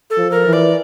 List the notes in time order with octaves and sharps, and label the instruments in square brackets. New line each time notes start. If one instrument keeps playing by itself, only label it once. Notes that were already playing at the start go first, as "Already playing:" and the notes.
[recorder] A4
[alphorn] F3
[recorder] A#4
[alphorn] E3
[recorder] D5